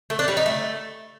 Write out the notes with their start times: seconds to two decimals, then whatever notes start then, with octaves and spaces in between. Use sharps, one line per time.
0.10 A3
0.19 D4
0.28 G3
0.37 D#4
0.46 A3